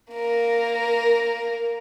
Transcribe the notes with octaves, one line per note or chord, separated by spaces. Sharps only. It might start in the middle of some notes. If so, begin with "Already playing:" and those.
A#3 A#4